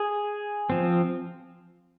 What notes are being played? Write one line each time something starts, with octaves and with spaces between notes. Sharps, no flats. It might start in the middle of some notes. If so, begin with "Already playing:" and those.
Already playing: G#4
F3 C4